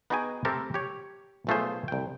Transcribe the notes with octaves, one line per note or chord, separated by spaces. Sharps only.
B3 D#4 F#4 G#4 G5 G#5
A3 C4 G4 A4 A#4
G4 C#5
B1 F3 A3 F4 G#4 C5
C2 G5